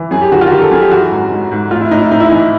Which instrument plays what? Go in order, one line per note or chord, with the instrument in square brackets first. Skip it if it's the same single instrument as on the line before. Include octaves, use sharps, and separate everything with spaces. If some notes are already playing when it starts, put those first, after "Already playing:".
Already playing: [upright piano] E3
F#2 G#4
G4
D#3 F#4
F4
F#4
D#3 G4
A4
F#2 G#4
G4
E3 F#4
G#2
G#2
G#2
A2 F4
E4
A2 D#4
E4
A2 D#4
E4
E3 D#4